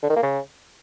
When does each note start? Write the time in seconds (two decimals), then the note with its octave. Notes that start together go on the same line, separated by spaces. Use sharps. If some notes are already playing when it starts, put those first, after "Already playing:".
0.03 D3
0.10 D#3
0.16 A#3
0.23 C#3